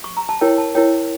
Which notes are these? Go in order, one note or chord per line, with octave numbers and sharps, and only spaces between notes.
C#6
A#5
A5
E4 A#4 C#5 G5
A5
E4 A#4 C#5 G5